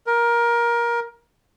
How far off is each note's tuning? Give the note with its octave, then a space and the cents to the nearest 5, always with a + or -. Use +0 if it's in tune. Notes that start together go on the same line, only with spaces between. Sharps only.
A#4 +20